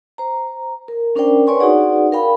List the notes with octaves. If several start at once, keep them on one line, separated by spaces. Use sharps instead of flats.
C5 A#5
A#4
C#4 D4 A#4 C5 D5 G5
B4 C#5 D5 G#5 C6 C#6
D#4 F#4 G#4 D5 F#5
A#4 F5 G5 B5